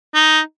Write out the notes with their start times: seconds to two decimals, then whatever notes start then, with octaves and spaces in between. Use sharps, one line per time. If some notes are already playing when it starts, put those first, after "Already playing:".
0.14 D#4